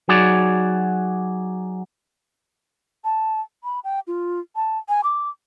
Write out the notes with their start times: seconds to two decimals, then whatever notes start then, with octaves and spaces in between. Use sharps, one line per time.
0.09 F#3 D#4 F#4 G#4 D5
3.04 A5
3.64 B5
3.84 G5
4.07 F4
4.56 A5
4.89 G#5
5.04 D6